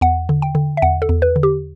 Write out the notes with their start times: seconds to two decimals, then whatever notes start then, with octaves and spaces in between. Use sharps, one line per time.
0.01 E2 F#5
0.29 D3
0.42 G5
0.55 D3
0.77 E5
0.82 E2 F#5
1.02 A4
1.09 E2
1.22 B4
1.36 D3
1.43 G4